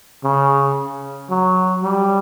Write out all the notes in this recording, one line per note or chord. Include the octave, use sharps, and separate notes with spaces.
C#3
F#3
G3